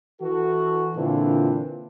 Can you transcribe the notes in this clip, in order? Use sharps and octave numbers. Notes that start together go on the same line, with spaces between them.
E3 F#4 A4
A#2 D3 E3 C4 D4 F4